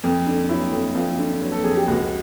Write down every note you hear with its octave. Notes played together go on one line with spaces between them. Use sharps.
F2
D3
F#3 E4
F2
F2 F4
D3
F#3
A4
F2 G#4
G4
C#2 F#4